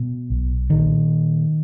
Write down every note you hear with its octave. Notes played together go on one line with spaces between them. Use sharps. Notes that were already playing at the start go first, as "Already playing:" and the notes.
Already playing: B2
B1
A#2 D#3